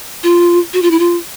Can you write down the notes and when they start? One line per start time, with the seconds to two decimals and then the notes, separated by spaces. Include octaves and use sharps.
0.23 F4
0.73 F#4
0.82 F4
0.91 E4
0.99 F4